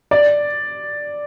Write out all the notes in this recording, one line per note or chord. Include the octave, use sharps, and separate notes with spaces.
D5